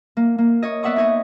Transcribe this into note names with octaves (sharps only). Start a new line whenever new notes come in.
A#3
A#3
C#5 D#5
B3 D5 E5 F#5 C#6 D#6
D#4 C#5 D#5